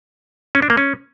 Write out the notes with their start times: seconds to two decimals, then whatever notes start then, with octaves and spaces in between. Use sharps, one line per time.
0.55 C#4
0.62 D4
0.70 A#3
0.77 C#4